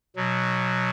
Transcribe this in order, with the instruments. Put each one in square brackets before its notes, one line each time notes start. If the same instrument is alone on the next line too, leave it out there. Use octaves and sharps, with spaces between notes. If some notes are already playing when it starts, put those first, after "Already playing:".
[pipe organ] B2 F#3